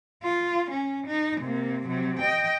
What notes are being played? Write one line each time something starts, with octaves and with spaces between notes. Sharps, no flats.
F4
C#4
D#4
C3 A#3
C3 F#3
D#5 G5